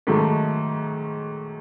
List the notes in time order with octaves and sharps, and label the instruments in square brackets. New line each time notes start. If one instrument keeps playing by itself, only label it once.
[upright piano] G#2 D#3 F#3 A3